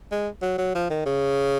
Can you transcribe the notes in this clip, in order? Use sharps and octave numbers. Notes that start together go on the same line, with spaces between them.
G#3
F#3
F#3
F3
D#3
C#3